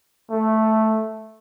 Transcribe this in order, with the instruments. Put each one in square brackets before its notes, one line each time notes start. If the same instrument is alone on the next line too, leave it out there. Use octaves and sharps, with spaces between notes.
[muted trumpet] A3